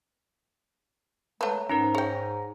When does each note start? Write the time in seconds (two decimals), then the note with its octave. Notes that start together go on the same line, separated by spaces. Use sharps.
1.41 G#3 A3 B3 B4 C#5 A#5
1.70 G#2 C#4 D#4 A#4 A#5
1.95 G#4 C#5 G5